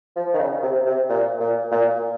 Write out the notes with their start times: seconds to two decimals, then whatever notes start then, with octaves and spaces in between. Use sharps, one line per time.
0.16 F3
0.34 D#3
0.39 C#3
0.63 C3
0.86 C3
1.09 A#2
1.40 A#2
1.71 A#2